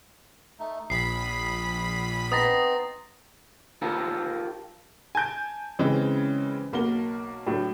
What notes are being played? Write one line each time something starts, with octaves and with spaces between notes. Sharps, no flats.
A3 D#4
A#1 B5 D#6 B6 C7
B3 C4 D#4 D#6 A6 A#6
F4 G4 A4 A#4
G#5 A5 G6 D7
C#3 E3 G#3 C4 C#4
B1 A#3 F#5 G7
A2 F#3 D4